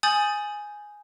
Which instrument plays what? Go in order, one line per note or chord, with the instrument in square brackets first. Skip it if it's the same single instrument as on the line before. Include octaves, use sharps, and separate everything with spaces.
[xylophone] G#5 D#6 G6 A6 F#7